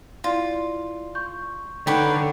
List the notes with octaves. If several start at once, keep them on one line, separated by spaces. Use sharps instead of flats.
E4 F4 D5
C6 C#6 G6
D3 D#4 B4 C#5 G5 A#5 B6